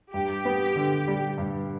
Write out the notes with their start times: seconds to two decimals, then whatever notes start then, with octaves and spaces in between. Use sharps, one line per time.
0.13 G2 G4
0.45 B3
0.76 D3
1.08 G3
1.38 G2